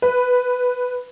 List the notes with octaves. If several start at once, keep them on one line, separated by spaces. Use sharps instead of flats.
B4